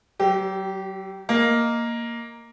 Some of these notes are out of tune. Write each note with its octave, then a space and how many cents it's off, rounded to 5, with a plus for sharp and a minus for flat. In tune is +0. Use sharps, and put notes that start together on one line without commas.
F#3 +35 G4 -20
A#3 +0 D#5 +0